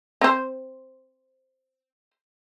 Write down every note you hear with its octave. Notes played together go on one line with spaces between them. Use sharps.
C4 C5